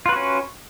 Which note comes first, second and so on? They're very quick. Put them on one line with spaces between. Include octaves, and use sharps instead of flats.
F4 B4 F#4 C#4